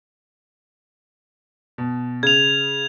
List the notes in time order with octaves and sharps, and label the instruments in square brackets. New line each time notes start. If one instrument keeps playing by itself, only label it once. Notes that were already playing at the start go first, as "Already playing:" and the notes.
[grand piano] B2
[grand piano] C#3 [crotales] G#6 F7